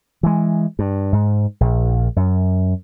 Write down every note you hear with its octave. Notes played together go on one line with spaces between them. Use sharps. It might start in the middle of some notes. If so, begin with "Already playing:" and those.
E3 G#3
G2
G#2
A#1
F#2